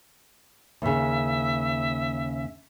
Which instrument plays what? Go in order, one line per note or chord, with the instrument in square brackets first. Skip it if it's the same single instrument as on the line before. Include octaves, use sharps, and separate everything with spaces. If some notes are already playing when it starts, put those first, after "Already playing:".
[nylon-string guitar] D#2 C#3 [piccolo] E5